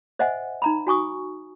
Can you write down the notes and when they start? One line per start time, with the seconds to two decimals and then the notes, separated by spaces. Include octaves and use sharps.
0.19 C5 D#5 E5 F#5 G#5
0.62 D#4 A#5 B5
0.87 F#4 G#5 C#6 D#6